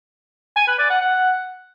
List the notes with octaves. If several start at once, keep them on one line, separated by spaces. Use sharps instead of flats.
G#5
B4
D5
F#5
F#5